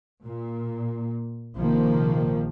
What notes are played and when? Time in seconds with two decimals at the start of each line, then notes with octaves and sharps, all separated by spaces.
0.22 A#2
1.56 A#1 C3 D#3 F3 A#3